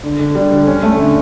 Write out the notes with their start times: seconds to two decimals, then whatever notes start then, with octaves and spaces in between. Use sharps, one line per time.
0.04 D3
0.20 D3
0.35 G3
0.51 D3
0.67 C#4
0.83 A3
0.99 D3